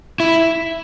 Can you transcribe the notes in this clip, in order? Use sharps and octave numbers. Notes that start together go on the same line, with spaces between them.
E4